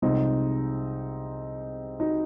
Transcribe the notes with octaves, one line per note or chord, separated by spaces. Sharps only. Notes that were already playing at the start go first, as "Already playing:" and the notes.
C2 C3 F3 G#3 C4 D#4
D#4 F#4